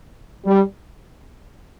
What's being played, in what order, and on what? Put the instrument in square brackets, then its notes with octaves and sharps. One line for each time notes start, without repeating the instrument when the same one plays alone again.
[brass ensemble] G3